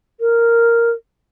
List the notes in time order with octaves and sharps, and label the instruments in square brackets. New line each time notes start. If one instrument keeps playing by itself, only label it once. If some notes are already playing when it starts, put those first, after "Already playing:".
[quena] A#4